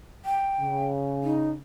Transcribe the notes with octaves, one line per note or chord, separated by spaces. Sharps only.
G5
C#3
D#4